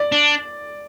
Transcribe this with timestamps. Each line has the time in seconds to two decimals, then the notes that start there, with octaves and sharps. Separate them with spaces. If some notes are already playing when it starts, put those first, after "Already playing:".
Already playing: D5
0.12 D4